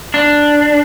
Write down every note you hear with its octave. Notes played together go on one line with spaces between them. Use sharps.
D4